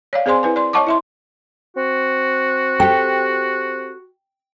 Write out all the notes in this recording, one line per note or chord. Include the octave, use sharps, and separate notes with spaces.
C#5 D5 F5
C4 G#4 C5 D5 G#5 C6
E4 B4 G#5
D5 C6
C#5 D#5 F#5 A5 C#6 D6
E4 E5 C6
C4 F#4
G4 A4 G5